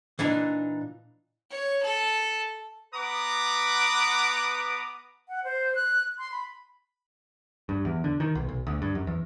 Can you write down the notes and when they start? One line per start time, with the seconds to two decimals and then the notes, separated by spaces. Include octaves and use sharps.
0.19 A#2 E3 D4 D#4
1.50 C#5
1.83 A4
2.94 B3 B4 F#5 A#5 D6 D#6
5.29 F#5
5.44 C5
5.75 F#6
6.18 C6
6.32 B5
7.69 G2
7.85 E2
8.04 D3
8.20 D#3
8.35 B1
8.49 B1
8.67 D2
8.82 G2
8.95 F#2
9.07 E2